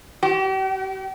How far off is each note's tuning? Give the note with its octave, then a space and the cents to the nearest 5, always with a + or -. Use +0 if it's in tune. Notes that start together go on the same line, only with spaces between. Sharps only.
G4 -40